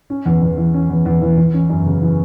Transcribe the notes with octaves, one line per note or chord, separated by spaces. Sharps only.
C#4
E2
E2
E3
C#4
E2
E2
E3
E3
C#4
F#2
C#3
E3